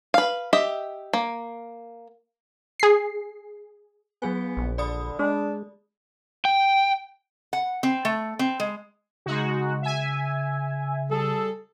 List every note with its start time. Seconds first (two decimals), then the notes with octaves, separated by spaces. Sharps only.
0.14 B4 F5
0.53 G4 D#5 E5
1.13 A#3
2.80 G#4 C7
4.22 F#3 B3 G#4 G#5
4.57 A#1
4.78 D3 D5 B5 D#6
5.19 G#3 D4
6.45 G5
7.53 F#5
7.83 C4
8.05 A3
8.39 C4
8.60 G#3
9.26 C#3 G#3 D#4 F#4
9.82 E5 G#5
11.10 G3 G#4 A4